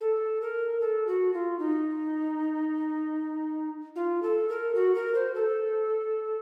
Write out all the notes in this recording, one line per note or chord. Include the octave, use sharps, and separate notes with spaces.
A4
A#4
A4
F#4
F4
D#4
F4
A4
A#4
F#4
A#4
C5
A4